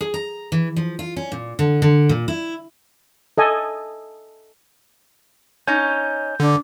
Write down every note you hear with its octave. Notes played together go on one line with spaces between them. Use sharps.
G#4
A#5
E3
F3
F4
C#4
A#2
D3
D3
A#2
E4
A4 D#5 G#5
C#4 D#4 G6
D3 D4